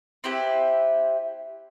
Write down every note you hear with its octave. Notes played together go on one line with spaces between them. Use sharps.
C4 E4 G4 B4